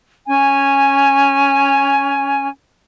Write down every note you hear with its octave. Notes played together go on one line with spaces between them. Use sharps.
C#4 G#5